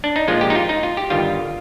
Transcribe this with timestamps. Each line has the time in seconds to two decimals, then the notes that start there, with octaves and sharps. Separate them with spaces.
0.04 D4
0.16 D#4
0.28 A#1 A#2 F3 G#3 F4
0.41 G4
0.50 D#4
0.55 F4
0.69 D#4
0.83 F4
0.97 G4
1.10 G1 G2 D#3 G3 F4